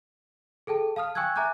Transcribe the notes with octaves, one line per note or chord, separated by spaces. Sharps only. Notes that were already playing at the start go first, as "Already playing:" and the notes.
G#4 A4 G5 A5
F5 A5 D#6 F6
G5 G#5 C#6 E6 F#6 G#6
E5 G#5 A#5 D6 F#6 G6